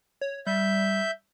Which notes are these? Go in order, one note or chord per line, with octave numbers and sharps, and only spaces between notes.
C#5
G3 E5 G6